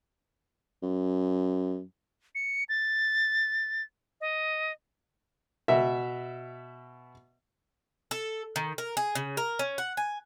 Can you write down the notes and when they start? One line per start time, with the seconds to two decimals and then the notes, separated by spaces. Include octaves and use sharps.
0.83 F#2
2.35 C#7
2.69 A6
4.21 D#5
5.68 B2 E5
8.11 A4
8.56 D#3
8.78 A#4
8.97 G#4
9.15 C#3
9.37 A#4
9.59 C#4
9.78 F#5
9.97 G#5